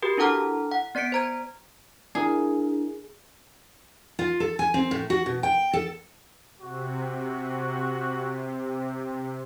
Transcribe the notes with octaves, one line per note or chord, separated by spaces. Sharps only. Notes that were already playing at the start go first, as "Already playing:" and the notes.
F#4 G4 A#4
D4 E4 A4 F#5 A#5 F6
F#5
B3 D5 B6 C#7 D7
C5 A#5 G#6
D4 E4 G#4 A#4
F4
A4
G#5
C4
A2
F#4
B2
G5
A4
C3 F#4